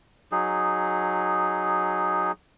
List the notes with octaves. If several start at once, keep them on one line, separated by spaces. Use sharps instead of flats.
F#3 D#4 G#4